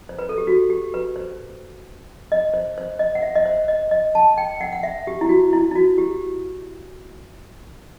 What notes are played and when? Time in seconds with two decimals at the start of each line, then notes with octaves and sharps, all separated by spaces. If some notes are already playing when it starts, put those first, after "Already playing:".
0.09 C5
0.19 B4
0.29 A4
0.38 G4
0.47 F#4
0.70 G4
0.94 B4
1.16 C5
2.32 D#5
2.54 C5
2.78 C5
2.99 D#5
3.15 F#5
3.22 E5
3.35 D#5
3.46 C5
3.68 D#5
3.91 D#5
4.15 A5
4.38 G5
4.61 F#5
4.72 F#5
4.83 E5
5.07 G4
5.21 E4
5.29 F#4
5.53 E4
5.71 E4
5.75 F#4
5.98 G4